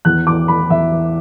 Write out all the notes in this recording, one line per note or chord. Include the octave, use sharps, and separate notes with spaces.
E2 F#6
E3 D6
E3 B5
E2 E5
E3